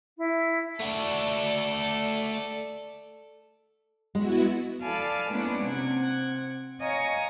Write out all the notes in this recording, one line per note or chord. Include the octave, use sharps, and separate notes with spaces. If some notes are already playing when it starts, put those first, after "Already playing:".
E4
A3 F#4 A4 D5
G#3 B3 E4 F#4
A4 D5 F5 G#5 A5 B5
G#3 A#3 B3 C#4 D4 E4
C3 C4 F#5 G#6
C#5 D#5 F5 G#5 A#5 C#6